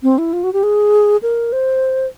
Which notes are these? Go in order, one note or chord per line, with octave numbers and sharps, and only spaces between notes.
C4
E4
F4
F#4
G4
G#4
A#4
C5